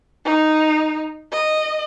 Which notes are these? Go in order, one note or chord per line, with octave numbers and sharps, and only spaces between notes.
D#4
D#5